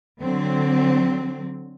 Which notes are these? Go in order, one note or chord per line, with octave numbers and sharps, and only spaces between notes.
D3 F#3 C4